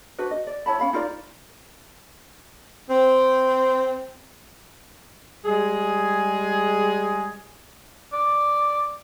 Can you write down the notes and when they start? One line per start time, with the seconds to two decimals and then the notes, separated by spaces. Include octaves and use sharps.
0.18 D4 F#4 B4 C5
0.31 D#5
0.47 D5
0.66 E4 C#5 A5 B5
0.79 C#4 F5 B5
0.93 D#4 F4 A#4 D5
2.90 C4
5.45 G3 G#3 G#4
8.13 D5